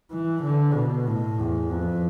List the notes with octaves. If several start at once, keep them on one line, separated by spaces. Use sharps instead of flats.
E3
D3
B2
A2
E2
F2